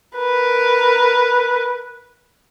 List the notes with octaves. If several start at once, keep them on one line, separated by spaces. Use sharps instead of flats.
A#4 B4